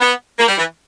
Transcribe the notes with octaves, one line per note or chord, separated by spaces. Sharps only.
B3
A#3
G3
E3